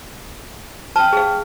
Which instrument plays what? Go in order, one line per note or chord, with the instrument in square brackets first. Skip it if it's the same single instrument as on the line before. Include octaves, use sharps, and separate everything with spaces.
[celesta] G5 F6 [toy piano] A5
[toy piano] G#4 F5